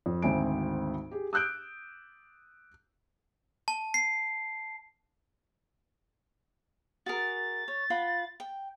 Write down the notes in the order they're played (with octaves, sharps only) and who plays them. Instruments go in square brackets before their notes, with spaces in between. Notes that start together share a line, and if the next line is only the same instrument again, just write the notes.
[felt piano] F2
G#1 D2 C4 G#5 D7
G4 G#4
D#6 E6 F#6 G6 D7
[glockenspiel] A5
C7
[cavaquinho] F#4 G#4 A#4 [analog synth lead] A6
[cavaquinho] C#5
F4 F#5 B5
G5